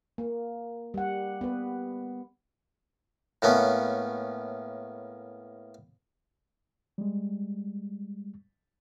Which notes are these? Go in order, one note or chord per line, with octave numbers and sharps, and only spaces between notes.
A#3
G3 F#5
B3 B4
A2 A#3 B3 C#4
G3 G#3